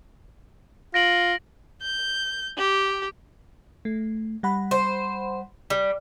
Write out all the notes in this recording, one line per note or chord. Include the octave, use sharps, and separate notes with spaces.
F4 A#6 D7 F#7
G6
G4
A3
G3 F#5 B5
C5
G3